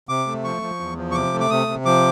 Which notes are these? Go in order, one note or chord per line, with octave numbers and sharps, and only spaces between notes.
C3 D6
A3
F3 C#6
F3
E2
F3
C#6
C3 D6
A3
D6
C3 D#6
C3
F3 D6